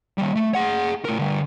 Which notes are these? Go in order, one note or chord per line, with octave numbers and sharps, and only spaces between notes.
D#3 G3
A3
G#4 F#5
A2 A#4
D3 G3